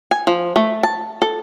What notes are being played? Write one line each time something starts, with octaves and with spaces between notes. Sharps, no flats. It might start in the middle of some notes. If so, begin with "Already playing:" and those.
G#5
F3
A3
A5
A4